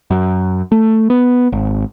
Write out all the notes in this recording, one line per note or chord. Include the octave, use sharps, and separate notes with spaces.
F#2
A3
B3
G#1